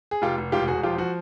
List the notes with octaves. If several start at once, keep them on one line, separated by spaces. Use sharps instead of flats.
G#4
F1 F4 G4
F1
E1 F4 G4
E1 F#4 G#4
F3 F4 G4
F3 F#4